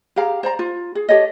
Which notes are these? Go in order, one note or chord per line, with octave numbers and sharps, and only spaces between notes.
G4 G#4 F5 A#5
C5 D5 A#5
F4
G#4
G4 A4 C#5 D#5